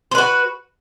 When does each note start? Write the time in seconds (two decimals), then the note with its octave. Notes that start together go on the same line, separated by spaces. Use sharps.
0.11 C5
0.15 B4
0.18 F#4